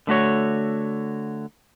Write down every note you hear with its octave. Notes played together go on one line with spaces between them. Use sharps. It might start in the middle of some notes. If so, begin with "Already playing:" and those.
D3 A3 F#4 C#5